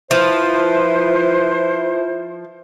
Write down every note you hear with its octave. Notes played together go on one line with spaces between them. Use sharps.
F3 E4 B4 C5